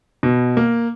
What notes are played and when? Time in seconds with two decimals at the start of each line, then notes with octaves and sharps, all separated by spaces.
0.23 B2
0.57 A#3